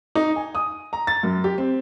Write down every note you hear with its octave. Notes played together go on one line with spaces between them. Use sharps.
D#4
G#5
D#6
A#5
A6
F#2
G4
C4